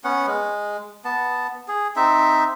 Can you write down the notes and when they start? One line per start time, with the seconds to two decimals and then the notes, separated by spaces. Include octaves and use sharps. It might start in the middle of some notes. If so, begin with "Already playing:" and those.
0.04 B3 C#4 F#5
0.26 G#3
1.05 B3 A5
1.68 G#4
1.96 C4 D#4 E5